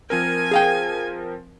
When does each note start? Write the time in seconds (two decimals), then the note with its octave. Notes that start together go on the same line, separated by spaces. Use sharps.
0.10 F3 C4 A#4 G#5
0.51 G#4 F5 G5